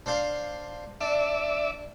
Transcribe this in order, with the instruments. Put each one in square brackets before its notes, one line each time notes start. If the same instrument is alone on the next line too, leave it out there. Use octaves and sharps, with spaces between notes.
[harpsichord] D4 C5 F5
[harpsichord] D4 [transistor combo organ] D5 E5